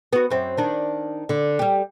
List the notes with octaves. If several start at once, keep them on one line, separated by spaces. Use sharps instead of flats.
B3 F#4
F#2 C4
D#3 D4
D3
G3 G4